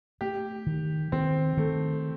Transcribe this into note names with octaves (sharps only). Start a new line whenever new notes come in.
A3 G4
D#3
D#3 C4
D#3 A3